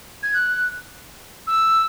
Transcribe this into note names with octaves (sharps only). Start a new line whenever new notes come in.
G#6
F#6
E6